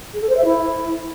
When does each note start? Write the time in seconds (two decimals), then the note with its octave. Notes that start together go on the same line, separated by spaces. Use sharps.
0.13 G#4
0.21 A4
0.29 C5
0.36 E5
0.44 E4